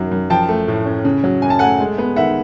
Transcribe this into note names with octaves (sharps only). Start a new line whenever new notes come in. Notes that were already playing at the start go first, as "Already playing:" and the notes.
Already playing: F#2 D#3 F#3
F#2
F3 G5 A5
A3
A2
C#4
C#3
F#3
F#2 G#5
A5
A3 F#5 G#5
G#3
B3
D#3 E5 F#5